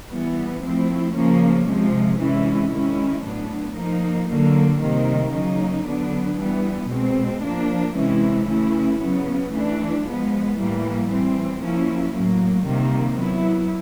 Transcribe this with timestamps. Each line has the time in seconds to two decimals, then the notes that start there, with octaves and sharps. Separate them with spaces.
0.11 E3 G3 B3
0.63 F3 A3 C4 E4
1.15 C#3 F3 A#3 C#4
1.68 C3 F3 G#3
2.19 C3 E3 G#3 C#4 E4
2.72 D#3 G#3 C#4 E4
3.25 A2 F#3 B3 D4
3.77 F3 A#3 D#4
4.29 D3 F#3 A#3
4.82 C3 D#3 G3 A#3
5.34 C#3 F#3 A#3 D#4
5.86 D3 F#3 B3 D4
6.39 E3 G3 B3
6.91 B2 G#3 C4
7.43 F3 A#3 D4
7.96 C3 E3 G#3 C#4 E4
8.47 C#3 E3 A3 C#4 E4
9.00 C#3 F#3 B3
9.52 E3 A3 D4
10.05 F3 G#3 B3
10.57 A2 E3 G3 A#3
11.10 E3 G3 C4
11.62 F3 A#3 C#4 E4
12.14 A2 F#3 A#3
12.66 C3 D#3 G3 A#3
13.19 F#3 B3 E4